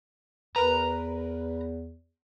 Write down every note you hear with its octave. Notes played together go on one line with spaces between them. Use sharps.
E2 A#4 B4 A#5